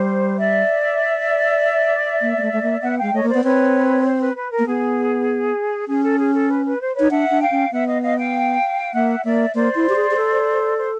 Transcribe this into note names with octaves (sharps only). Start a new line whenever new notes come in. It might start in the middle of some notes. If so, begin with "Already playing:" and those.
Already playing: G3 C5
D5 E5
A#3
A#3
A3
A3
A#3
B3 E5 F#5
G#3 F5 G5
A3 C#5 D#5
A#3
C5 D5
B3
C4 B4 C#5
C5
B4
B4
A#4
A#3
B3 G#4
C#4 G#4
A4
G#4
A4
B4
B4
C5
D#4 B4 C#5
D4 E5 F#5
D4
F5 G5
C#4
B3 E5 F#5
D#5 F5
D#5 F5
F5 G5
A#3 E5 F#5
A#3 D5 E5
A#3 C5 D5
E4
G4
G#4
G#4
A4
C5